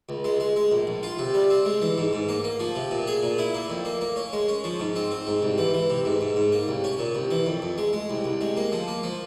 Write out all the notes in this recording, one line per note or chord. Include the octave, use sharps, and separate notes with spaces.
C#2
G#3
G#3
G#3
A#1
A#1
F4
C3
G3
C4
G#3
E3
G#2
G#2
A#3
A#3
F3
C3
A#2
G#4
A#2
E4
A#3
F2
A#3
A#3
C#4
G#3
C#4
F3
G#2
C4
C4
G#2
C2
E3
E3
C3
G#2
G#2
G#2
A#3
C2
C#4
A#2
C2
E3
F2
F2
G#3
G#3
C2
C2
G#3
A#3
F3
A#3
F3